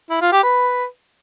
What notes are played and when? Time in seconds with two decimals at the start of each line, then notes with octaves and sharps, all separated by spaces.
0.10 E4
0.21 F4
0.32 G4
0.43 B4